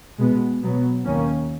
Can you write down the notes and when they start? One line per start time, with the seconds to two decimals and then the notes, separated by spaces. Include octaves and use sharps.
0.18 B2 G#3 B3
0.61 B2 F#3 B3
1.05 D#2 D#3 A#3 C#4